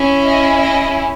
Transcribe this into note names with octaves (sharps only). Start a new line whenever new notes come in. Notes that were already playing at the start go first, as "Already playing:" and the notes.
Already playing: C#4 E4 G#4
D#5
D#5